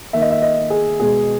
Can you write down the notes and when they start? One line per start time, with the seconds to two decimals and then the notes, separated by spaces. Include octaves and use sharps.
0.13 D#3 A#3 E5
0.22 D#5
0.31 E5
0.42 D#5
0.70 G#4
1.00 B2 G#3 G#4